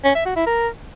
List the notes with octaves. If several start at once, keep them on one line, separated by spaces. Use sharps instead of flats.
C#4
E5
F#4
E4
A#4